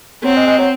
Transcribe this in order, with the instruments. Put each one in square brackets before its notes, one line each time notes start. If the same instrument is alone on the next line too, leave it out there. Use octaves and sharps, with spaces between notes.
[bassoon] F#3 [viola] C4
[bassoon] G#3
G#3
F#3